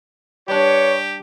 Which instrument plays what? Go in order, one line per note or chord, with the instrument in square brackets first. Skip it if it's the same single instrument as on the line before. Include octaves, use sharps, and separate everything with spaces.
[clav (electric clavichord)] G3 D4 [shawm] G4 [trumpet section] B4 C#5